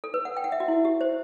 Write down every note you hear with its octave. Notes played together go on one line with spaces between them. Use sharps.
A4
B4
F#5
G5
F#5
E5
F#4
E4
G4
C5